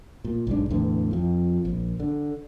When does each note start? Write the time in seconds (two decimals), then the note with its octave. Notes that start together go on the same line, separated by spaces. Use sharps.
0.24 A#2
0.47 B1 G#2 D4
0.70 E2 A2 D3 E3
1.11 F2 F3
1.65 A#1
2.00 D3